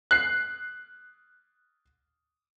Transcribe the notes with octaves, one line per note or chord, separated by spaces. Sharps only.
F#6 C7